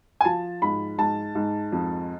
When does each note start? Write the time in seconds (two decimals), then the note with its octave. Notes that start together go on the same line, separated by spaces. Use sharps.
0.21 G#5
0.25 F3 A5
0.62 G#2 B5
0.98 G#2 A5
1.35 G#2
1.72 F2